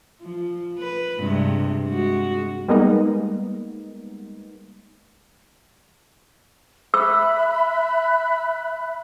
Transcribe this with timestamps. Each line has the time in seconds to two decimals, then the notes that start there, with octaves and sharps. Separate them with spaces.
0.21 F3
0.78 B4
1.19 G2 C3 G#3
1.87 G#3 F#4
2.68 G3 G#3 A#3 B3 D#4
6.94 E5 B5 E6 F#6